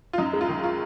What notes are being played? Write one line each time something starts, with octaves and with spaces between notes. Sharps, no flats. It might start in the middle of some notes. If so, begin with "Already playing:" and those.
F4
F#2 D#4
G#3
F4
D#3
F4